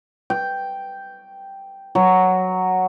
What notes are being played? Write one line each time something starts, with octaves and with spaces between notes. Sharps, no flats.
G5
F#3